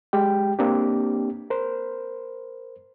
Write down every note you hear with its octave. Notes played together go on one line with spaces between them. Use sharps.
G#3 G4 G5
A#3 C4 D4 G4
A#4 C5